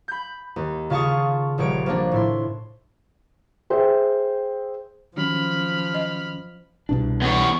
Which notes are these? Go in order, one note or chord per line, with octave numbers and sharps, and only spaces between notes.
B5 G6
D#2
C#3 F4 F5 A5 C#6 D#6
D#1 A#1 C#5 D7
F3 A#3 D4
A2 E4 C6
G#4 C5 E5 G5
D#3 F3 F#3 C#4 B5 F6
D#5
C2 B2 D4
E2 C#5